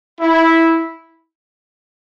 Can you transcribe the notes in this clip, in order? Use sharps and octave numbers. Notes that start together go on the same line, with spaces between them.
E4